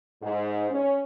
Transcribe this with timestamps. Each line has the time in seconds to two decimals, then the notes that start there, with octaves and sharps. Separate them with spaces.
0.23 G#2
0.71 C#4